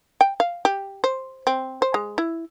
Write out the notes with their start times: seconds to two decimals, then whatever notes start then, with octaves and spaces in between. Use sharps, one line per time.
0.21 G5
0.40 F5
0.65 G4
1.04 C5
1.47 C4
1.82 C5
1.94 G#3
2.18 E4